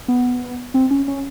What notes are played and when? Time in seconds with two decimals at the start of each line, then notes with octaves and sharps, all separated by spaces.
0.08 B3
0.74 C4
0.91 C#4
1.08 C#4